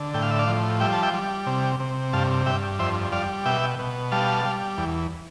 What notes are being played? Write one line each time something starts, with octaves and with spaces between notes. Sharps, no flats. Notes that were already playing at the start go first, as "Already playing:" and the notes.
Already playing: D3
A2 G5
F5
E5
D5 F5
F3
G3 E5 G5
A5
E5 G5
G3
C3
C3
G2 F5 A5
G2 E5 G5
F2 C5 E5
G3 D5 F5
B2 E5 G5
B2
G3 F5 A5
G3
E2